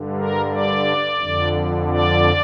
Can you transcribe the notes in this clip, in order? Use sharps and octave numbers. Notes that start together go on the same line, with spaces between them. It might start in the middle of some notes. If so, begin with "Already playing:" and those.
Already playing: G2 D3
A#4
D5
F2 D3
D5